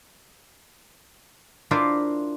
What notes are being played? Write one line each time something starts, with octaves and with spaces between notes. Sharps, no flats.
D4 E4 F4 A#4 C5 E5